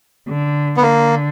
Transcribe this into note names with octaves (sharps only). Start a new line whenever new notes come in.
D3
B3
D3 A#3